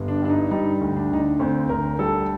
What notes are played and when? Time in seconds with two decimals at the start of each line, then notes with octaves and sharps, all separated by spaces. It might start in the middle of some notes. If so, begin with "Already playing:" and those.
Already playing: G1
0.08 D4
0.22 G2 D4
0.30 D#4
0.51 G3 D#4
0.81 D2
0.96 D4
1.11 D2 D#4
1.18 D4
1.35 D4
1.39 D2 C4
1.69 D2 A#4
1.99 G3 A4